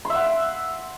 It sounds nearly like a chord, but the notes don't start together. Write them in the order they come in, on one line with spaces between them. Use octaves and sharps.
C6 E5 F#5